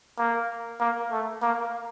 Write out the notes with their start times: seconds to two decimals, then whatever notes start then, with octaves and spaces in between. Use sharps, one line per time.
0.18 A#3
0.80 A#3
1.10 A3
1.42 A#3